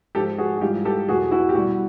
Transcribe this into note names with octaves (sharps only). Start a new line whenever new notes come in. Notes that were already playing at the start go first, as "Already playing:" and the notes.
G#2 F3 G4 A4
F#4 G#4
F#4
G#2 E3 G3 F4 G4
G4 A4
E2 B2 F#3 F#4 G#4
E4 F#4
G4
B2 G3 E4 F#4